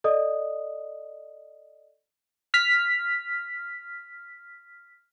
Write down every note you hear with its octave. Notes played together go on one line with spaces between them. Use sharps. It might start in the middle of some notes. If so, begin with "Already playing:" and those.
A4 D5 D#5 D#6
F6 B6